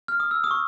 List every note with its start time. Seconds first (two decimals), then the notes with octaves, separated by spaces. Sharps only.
0.08 F6
0.20 D#6
0.31 E6
0.44 D#6
0.51 C#6